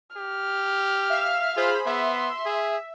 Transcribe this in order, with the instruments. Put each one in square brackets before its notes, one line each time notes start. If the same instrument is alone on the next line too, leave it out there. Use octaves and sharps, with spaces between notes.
[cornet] G4 [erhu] F6
[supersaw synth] E5 F5
[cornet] F4 [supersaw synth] G#4 C5 B5
[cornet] B3 [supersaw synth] E5 [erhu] C6
[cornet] G#4